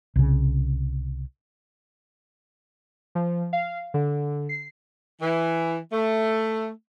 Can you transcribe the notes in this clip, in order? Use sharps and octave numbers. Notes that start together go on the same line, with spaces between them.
C2 C#3
F3
F5
D3
C7
E3
A3